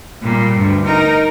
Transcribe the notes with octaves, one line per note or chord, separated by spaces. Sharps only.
A#2 G3
D2 G2
D#4 A#4